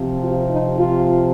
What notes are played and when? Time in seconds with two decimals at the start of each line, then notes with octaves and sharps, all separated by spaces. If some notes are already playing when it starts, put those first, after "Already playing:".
Already playing: C3 F3
0.19 F4
0.49 D#4
0.78 F4